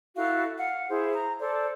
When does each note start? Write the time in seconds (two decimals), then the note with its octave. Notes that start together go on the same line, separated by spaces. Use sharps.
0.16 E4 F#4 A4 F5
0.57 F5 F#5
0.89 E4 G#4 C5
1.14 A#5
1.40 A4 C5 D5